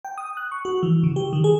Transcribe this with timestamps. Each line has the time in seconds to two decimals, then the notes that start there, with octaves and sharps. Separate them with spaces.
0.05 G5
0.18 D#6
0.37 F#6
0.52 C#6
0.65 F#4
0.83 E3
1.03 C#3
1.16 G4
1.33 D#3
1.44 G#4